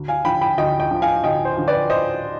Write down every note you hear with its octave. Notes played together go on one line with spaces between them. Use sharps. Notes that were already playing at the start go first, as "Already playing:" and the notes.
Already playing: D2
F5 G#5
D3 F3 G5 B5
G5 B5
D2 D#5 G5
D#5 G5
D3 F3
F5 G#5
D2 D#5 G5
C5
D3 F3
B4 D5
C5 D#5